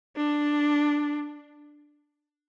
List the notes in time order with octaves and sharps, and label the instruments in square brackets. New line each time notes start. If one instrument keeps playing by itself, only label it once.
[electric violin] D4